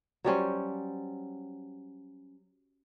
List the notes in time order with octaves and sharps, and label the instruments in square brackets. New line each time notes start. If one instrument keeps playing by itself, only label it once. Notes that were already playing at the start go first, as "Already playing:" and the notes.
[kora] F#3 G3 C#4 C5